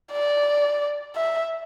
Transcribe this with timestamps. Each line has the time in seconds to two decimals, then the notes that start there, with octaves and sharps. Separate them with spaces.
0.12 D5
1.16 E5